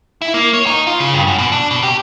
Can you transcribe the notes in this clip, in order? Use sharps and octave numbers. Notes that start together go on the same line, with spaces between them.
E4
A#3
C#5
D#4
F4
C#3
G2
F#2
B2
D4
B2
G4